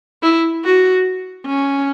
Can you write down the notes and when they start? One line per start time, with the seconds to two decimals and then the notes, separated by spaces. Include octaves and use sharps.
0.23 E4
0.65 F#4
1.46 C#4